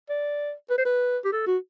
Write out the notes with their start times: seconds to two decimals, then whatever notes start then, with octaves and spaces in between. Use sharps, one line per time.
0.09 D5
0.70 B4
0.78 C5
0.85 B4
1.25 G4
1.32 A4
1.47 F#4